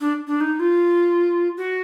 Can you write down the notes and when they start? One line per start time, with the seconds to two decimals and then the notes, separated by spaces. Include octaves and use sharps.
0.01 D4
0.27 D4
0.41 D#4
0.60 F4
1.58 F#4